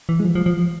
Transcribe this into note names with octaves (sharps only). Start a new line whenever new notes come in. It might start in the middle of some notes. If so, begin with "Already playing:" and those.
E3
G#3
F3
F3
F3